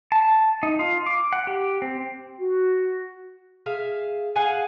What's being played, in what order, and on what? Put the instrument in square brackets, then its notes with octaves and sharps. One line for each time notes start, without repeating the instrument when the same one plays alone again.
[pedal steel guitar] A5
D#4
F4
D6
F#5
G4
C4
[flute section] F#4
[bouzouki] G#4 E5 F5
G#4 F5 F#5 G#5